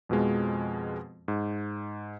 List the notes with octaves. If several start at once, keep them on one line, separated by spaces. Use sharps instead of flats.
F2 B2 F3 G#3
G#2